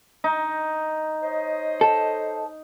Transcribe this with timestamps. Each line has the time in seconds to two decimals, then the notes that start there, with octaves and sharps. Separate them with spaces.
0.24 D#4
1.22 C5 C#5 D#5
1.81 A4